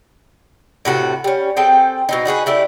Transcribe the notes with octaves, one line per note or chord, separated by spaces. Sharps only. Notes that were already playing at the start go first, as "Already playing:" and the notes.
A2 C3 F#4 A4
G3 C#4
C4 G#4 A4 G5
B2 C4 D#4
D#4 F#4 G#4 B4
A3 D4 E4 G4